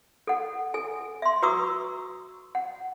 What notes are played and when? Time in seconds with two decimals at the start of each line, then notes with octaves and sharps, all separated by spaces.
0.27 A4 F#5
0.74 A4 G#5
1.22 E5 C6
1.42 F#4 B4 A#5 C#6 D#6 E6
2.55 F#5